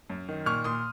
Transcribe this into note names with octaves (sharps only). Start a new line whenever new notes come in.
F#2
D#3
A#2 C#6 F6
A#2 C6 D#6